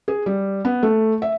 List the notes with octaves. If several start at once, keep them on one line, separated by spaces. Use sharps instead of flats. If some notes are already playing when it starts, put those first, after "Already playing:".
G#4
G3
B3
A3
E5